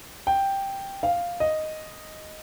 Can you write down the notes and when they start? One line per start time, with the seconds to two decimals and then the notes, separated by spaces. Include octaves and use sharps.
0.27 G5
1.03 F5
1.40 D#5